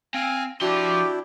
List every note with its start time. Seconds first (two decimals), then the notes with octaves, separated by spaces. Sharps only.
0.14 C4 F5 G#5
0.61 F3 D4 E4 F#4 G4 C6